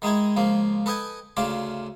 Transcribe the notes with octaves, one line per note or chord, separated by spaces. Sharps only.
D#3 G#3 D#4 E4 G#5
C#2 F3 A#3
A4 B4 D#5 G5 G#5
D2 C#3 A3 F4 D6